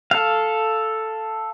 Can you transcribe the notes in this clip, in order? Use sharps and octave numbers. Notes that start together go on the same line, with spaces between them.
A4 F5